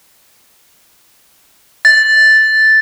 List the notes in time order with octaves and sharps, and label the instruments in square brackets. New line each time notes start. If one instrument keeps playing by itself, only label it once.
[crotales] A6